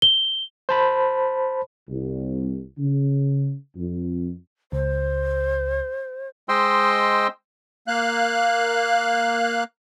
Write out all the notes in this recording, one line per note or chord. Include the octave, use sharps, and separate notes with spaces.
G7
C5 A5 B5
C2
C#3
F2
C#2 C5
G#3 C5 D#5 G5 C6 E6
A#3 F5 F#6